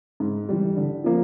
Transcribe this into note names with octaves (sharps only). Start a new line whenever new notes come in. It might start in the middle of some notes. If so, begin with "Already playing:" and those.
G#2
E3 G3
D3
F3 A#3